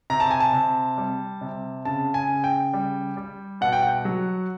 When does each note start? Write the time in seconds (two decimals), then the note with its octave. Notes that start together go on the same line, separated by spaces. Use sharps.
0.10 C3 A#5
0.20 A5
0.31 G#5
0.40 A5
0.53 C3
0.98 G3
1.41 C3
1.85 C#3 A5
2.14 G#5
2.29 C#3
2.44 G5
2.73 G3
3.17 G3
3.61 B2 F#5
3.72 G5
3.82 F#5
4.05 F#3